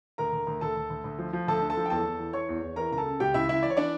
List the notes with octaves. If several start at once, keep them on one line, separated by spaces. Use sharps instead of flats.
D2 A#4 A#5
D2
D2
D2 A4 A5
D2
D2
D2
F3
F3
D2 A4 A5
D3
A4 A5
F3
G5
E2 A4 A5
E2
E3
E3 C#5 C#6
E2
E2
E3 A#4 A#5
C#2 A#5
A4 A5
C#3
C#2 G4 G5
C#2 E4 E5
C#2 E4 E5
E3 D5
C#5
E3 D4 D5